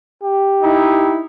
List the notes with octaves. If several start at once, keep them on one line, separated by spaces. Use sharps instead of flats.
G4
D#4 E4